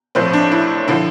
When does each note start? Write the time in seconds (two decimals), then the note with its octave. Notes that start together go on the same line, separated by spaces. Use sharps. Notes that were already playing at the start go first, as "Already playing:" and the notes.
0.15 A1 A2 F3 C4
0.33 D4
0.51 E4
0.88 D3 F3 E4